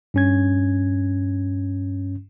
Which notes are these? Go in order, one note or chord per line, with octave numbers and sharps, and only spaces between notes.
G2 C#4 G#6